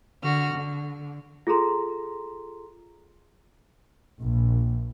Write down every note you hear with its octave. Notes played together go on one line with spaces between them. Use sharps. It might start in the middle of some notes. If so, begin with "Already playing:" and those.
D3 F#4 F6
D3
F4 G#4 A4 A#5 C6
A#1